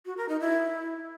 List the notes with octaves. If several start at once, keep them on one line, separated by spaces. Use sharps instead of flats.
F#4
A#4
D#4
E4